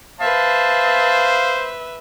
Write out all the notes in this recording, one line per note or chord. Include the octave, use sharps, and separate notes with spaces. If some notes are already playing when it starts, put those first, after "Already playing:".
B4 C5 E5 F5 A5